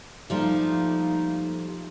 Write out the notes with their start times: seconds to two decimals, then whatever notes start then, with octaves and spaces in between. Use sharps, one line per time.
0.30 F3 G3 A3 A#3 D#4